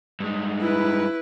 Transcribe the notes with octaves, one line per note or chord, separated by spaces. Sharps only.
G2 G#3
E4 B4